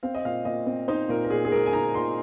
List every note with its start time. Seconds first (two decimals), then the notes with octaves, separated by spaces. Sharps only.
0.03 C4 F5
0.14 D#5
0.25 A#2 F5
0.45 A#2 D#5
0.66 C4
0.88 D#4 C5
1.09 A#2 A#4
1.25 A#4
1.30 A#2 G#4
1.45 G#4
1.52 G#3 A#4
1.66 G#5
1.73 D#4 A#5
1.94 A#2 C6